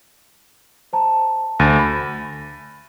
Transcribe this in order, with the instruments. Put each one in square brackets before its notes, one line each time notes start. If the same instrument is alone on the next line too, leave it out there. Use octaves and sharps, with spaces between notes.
[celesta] C5 A5 A#5
[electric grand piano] D2 [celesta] A6 A#6 D#7
[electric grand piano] B5